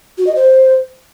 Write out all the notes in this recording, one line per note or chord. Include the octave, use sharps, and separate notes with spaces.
F#4
D#5
C5